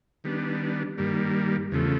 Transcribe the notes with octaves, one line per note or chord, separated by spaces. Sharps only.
D#3 G3 B3 D4
G2 D#3 G3 A#3
E2 C#3 F3 A3